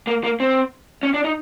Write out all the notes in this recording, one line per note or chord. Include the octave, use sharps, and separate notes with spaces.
A#3
A#3
C4
C#4
D4
D#4